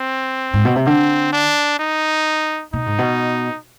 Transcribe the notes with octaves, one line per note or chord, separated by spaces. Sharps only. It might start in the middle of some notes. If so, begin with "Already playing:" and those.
Already playing: C4
G#2
B2
C3
D3 C4
D4
D#4
B2 D#4
G#2
B2